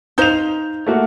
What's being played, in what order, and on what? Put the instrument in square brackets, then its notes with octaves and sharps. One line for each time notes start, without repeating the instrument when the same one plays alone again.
[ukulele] D#4 C5 F5 [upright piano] G6 F7
[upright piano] A3 A#3 F#4